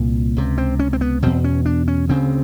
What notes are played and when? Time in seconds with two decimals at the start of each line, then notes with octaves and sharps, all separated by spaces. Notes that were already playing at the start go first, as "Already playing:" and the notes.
Already playing: C2 A#2
0.37 C#2 C3
0.58 C4
0.79 C#4
0.93 C4
1.01 B3
1.22 E2 B2 C4
1.44 C#4
1.66 D4
1.88 C#4
2.09 D2 C#3 C4